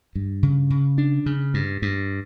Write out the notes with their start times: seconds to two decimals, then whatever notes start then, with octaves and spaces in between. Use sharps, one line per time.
0.15 G2
0.43 C#3
0.70 C#3
0.98 D4
1.26 C#3
1.54 G2
1.82 G2